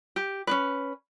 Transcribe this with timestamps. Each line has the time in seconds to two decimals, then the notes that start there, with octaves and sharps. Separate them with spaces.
0.16 G4
0.47 C#4 D4 B4